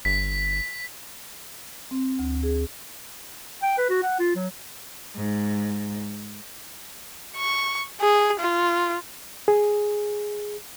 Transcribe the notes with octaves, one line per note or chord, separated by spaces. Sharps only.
G1 B6
C4
D2
G#4
G5
B4
F#4
F#5
F4
F#3
G#2
C#6
G#4
F4
G#4